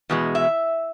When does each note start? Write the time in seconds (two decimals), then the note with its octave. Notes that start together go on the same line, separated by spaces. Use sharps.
0.10 E2 B2 G#3
0.35 E5